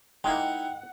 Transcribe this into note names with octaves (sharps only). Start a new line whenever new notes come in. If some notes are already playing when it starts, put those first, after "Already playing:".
G#3 A#3 D#4 E4 F#5 G5